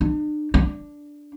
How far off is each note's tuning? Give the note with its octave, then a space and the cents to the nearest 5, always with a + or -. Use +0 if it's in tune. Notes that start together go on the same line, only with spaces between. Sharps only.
D4 +45
D4 +0